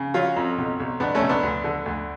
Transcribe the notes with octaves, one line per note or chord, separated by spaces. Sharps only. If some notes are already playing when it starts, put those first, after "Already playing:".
Already playing: C#3
F#3 C#4 F4
F2
B1
B1
B1 B3 D4
A3 C#4
B1
B3 D4
D2
D3
D2